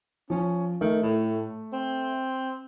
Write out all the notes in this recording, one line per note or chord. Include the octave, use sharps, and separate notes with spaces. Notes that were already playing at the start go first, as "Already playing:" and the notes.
F3 C#4
D#3 A3
A2
C4